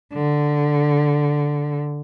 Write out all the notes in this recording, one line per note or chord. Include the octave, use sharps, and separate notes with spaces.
D3